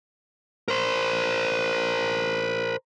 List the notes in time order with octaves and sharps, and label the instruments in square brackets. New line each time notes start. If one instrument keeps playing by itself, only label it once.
[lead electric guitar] A#4 C5